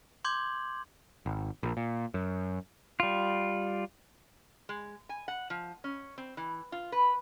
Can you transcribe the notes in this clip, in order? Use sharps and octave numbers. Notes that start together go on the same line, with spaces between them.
C6 D6 G6 G#6 F#7
G#1
A#1
A#2
F#2
G3 F4
G#3
G#5
F#5
F3
C#4
C4
E3
F4
B4